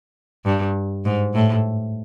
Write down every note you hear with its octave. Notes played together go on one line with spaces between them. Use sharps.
G2
G#2
A2